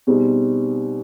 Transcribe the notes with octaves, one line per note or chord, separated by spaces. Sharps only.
B2 G3 C4 D#4 G#4